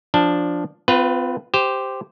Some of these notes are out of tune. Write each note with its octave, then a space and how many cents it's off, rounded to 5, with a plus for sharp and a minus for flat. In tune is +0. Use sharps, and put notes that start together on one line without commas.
F3 +0 D4 +0 A5 +0
C4 -40 F4 +0 B4 +0
G4 +0 C5 -10